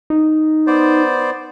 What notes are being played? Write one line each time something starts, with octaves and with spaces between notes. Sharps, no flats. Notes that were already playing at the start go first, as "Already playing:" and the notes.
D#4
B3 C5 D5